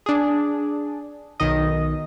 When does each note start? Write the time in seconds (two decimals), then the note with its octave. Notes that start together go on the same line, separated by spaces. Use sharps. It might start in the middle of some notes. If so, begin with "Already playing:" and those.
0.06 D4 G#4
1.40 B1 D#3 D#5